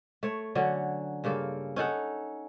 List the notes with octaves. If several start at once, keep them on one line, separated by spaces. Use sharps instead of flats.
A3 C#5
D3 F#3 C#4
G2 C#3 A#3 A4
C#4 D#4 A4 F#5